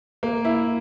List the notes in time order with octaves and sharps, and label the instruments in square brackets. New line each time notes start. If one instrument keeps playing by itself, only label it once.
[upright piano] A#3
E4